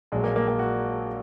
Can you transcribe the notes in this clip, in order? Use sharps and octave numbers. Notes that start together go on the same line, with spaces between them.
A#1 A#2 F#3 G#3
A#3
A#3
A#3
F#4